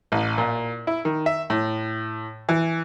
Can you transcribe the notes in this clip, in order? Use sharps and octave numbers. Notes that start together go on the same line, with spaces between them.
A1
A#2
E4
D#3
E5
A2
E3